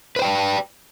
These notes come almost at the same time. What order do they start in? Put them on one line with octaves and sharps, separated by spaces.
B4 C5 G5 D5